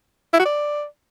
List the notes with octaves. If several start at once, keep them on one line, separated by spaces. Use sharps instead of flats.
E4
F#4
D5